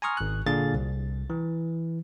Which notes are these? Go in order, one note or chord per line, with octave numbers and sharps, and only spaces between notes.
G#5 A#5 C6 C#6 D#6 F6
G#1 F#6
A#2 D3 D4 G#4 F5 A6
C2
E3